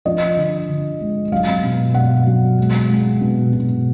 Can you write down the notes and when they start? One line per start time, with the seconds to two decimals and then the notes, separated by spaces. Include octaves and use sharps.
0.05 F3 D#5
0.37 D3
0.69 D3
1.01 G#3
1.32 F#3 F5
1.63 B2
1.94 B2 F#5
2.26 F#3
2.58 G#3
2.90 G#3
3.21 B2
3.53 B2